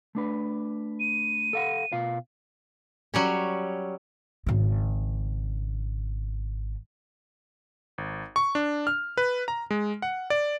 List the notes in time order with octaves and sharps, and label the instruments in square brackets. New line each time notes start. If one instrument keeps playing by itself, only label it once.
[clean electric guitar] A3 D4 B4
[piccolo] D#7
[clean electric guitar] A4 F5 F#5
B2 F4 F5
[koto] F#3 G3 C#4
[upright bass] G#1 C#3
[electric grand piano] G#1
C#6
D4
F6
B4
A#5
G#3
F#5
D5